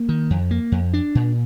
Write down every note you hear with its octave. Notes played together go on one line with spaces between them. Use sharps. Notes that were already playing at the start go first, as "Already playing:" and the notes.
Already playing: A#3
D#3
F2
A#3
F2
D4
A#2